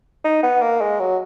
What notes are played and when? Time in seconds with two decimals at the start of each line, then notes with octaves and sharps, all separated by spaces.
0.24 D#4
0.43 B3
0.62 A#3
0.81 G#3
1.00 F#3